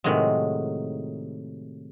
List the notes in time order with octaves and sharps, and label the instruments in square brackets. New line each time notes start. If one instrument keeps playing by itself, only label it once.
[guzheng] A2 C3 D#3 F#3 G#3